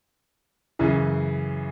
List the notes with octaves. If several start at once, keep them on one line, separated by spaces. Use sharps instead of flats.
F#2 C#3 E3